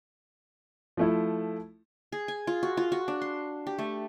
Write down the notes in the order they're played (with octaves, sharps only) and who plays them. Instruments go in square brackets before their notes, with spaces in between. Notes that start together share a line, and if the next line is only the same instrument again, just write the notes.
[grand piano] F3 A3 E4
[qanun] G#4
G#5
F4
F#4
F4
F#4
D4
C6
G4
A3